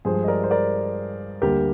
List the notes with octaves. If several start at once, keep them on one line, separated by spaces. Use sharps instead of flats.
G2 F3 G#3 G#4 C5
D#5
A#4 D5
C5
A#4 D5
D2 D3 G3 A#3 G4 A#4